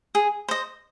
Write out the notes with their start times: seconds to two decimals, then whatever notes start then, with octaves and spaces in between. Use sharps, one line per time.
0.15 G#4
0.48 C5 D#5